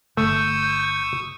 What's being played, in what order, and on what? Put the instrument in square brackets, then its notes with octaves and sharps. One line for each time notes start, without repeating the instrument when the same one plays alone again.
[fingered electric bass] G1 D3 [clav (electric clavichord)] A3 [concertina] C#6 D#6 E6 [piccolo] G6